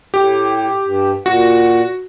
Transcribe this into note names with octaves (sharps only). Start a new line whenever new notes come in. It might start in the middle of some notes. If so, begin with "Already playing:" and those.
A2 G4
G2
A#2 F#4 F#5